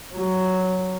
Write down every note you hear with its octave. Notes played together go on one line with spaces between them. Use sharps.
F#3